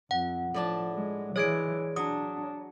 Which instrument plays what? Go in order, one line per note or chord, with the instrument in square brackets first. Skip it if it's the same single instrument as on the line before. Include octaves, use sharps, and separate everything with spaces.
[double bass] F2 [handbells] F#5
[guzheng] A2 D4 A5 [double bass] F3
[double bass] G#3
[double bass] E3 [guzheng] G#3 G#4 D5 [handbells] C#5 G#6 D7
[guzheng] F#3 [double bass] D4 [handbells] D#6